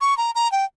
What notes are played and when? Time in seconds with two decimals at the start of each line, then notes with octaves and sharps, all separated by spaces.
0.01 C#6
0.18 A#5
0.35 A#5
0.52 G5